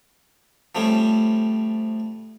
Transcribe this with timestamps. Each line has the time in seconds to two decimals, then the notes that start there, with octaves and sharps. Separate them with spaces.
0.75 F3 G3 A3 C4 C#4